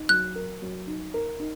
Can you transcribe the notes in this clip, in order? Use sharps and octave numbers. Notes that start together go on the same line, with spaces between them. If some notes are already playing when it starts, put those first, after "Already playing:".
Already playing: D#4
F#3 F#6
A#4
F#3
D#4
A#4
D#4